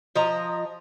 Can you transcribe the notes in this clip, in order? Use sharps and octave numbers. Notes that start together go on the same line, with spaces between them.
F3 D#5 A#5